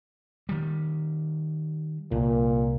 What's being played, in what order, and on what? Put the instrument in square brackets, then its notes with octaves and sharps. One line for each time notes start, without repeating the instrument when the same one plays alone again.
[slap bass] D#3 G3
[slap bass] C2 [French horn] A#2